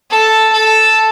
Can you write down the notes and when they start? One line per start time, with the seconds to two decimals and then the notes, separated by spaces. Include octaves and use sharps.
0.10 A4
0.53 A4